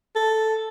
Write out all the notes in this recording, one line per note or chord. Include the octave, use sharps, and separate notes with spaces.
A4